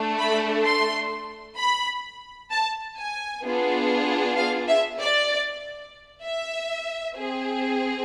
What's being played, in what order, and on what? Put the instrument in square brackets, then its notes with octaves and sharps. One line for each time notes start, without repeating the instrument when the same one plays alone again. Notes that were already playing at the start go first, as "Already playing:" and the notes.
Already playing: [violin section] A3 D4 A4
B5
C6
B5
A5
G#5
B3 D4 F4 G#4
F5
E5
D5
E5
C4 G#4